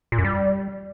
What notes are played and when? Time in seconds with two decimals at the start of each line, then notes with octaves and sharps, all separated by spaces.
0.12 A#2
0.18 F#2
0.25 G3